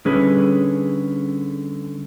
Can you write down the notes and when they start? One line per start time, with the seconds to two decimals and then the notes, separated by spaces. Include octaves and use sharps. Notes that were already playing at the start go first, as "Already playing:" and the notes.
0.05 D3 G3 C#4 G#4 B4